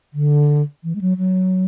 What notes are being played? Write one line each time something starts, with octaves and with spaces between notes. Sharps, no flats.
D3
E3
G#3
F#3
F#3